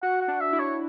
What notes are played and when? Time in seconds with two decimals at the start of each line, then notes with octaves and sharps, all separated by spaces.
0.03 F#4 F#5
0.22 F#5
0.28 D4
0.41 E5
0.53 E4
0.60 C#5